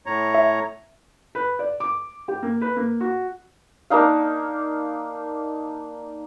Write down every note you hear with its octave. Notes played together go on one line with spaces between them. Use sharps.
A2 C#5 A#5
E5
B4
D5
D6
G4
A#3
B4
A#3
F#4
A#3 D4 D#4 F5